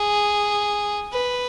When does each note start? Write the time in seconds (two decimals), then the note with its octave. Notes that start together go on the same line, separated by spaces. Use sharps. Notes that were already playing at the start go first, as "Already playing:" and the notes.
Already playing: G#4
1.13 B4